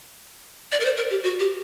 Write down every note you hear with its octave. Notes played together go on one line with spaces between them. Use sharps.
D5
A#4
C5
A#4
G4
F#4
G4